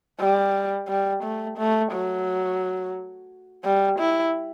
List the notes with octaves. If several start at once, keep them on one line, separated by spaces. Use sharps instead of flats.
G3
G3
A3
A3
F#3
G3
E4